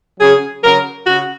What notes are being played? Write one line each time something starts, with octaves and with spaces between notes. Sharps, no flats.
C#3 F#3 G#4
C#3 F#3 A#4
C#3 F#4